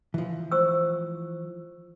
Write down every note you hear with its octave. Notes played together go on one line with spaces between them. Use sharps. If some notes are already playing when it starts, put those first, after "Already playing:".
E3 F3
C5 C#6 E6